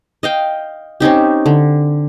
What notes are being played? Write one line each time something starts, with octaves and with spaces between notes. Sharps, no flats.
D#5 F5 G5
C4 C#4 D#4 G4
D3